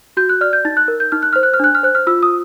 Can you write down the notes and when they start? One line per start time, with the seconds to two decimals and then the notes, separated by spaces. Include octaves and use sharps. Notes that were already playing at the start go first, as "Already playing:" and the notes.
0.17 F#4 G6
0.29 F#6
0.41 D5 F6
0.53 G6
0.65 D#4 A6
0.77 F#6
0.88 A#4
1.00 G6
1.12 D#4 F6
1.22 F#6
1.33 C5 F6
1.43 F#6
1.54 F6
1.60 D4 F#6
1.75 F6
1.83 C5 F#6
1.95 F6
2.07 F4 E6
2.23 D#6